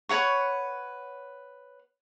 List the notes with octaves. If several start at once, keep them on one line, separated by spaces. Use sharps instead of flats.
B4 C#5 F#5 C#6